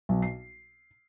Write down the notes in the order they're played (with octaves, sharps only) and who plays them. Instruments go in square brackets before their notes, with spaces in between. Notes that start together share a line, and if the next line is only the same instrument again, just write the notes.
[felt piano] B1
C7